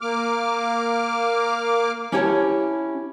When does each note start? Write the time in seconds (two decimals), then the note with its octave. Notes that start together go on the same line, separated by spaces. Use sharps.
0.01 A#3 D6 F6
2.12 C#4 E4 G4 C#5 G5 A5